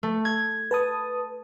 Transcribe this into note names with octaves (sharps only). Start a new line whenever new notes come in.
A3
G#6
B4 A5 D#6